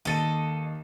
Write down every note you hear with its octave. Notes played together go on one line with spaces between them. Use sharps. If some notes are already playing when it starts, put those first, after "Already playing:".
D#2 A4 D#5 A6 D#7